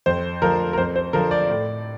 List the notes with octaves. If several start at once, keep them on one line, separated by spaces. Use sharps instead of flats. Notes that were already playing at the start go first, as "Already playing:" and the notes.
F2 C5
D3 F3 A#4
A#4
F2 C5
C5
D3 F3 A#4
D5
A2